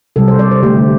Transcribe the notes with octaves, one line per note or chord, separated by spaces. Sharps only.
C3 G3 A4
C5
D5
C5
D3 A3 G4